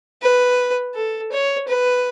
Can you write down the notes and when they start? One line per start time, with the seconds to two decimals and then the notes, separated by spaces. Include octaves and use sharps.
0.22 B4
0.95 A4
1.32 C#5
1.68 B4